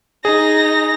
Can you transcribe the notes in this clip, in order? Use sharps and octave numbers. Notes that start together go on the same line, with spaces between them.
D#4 G#4 A#6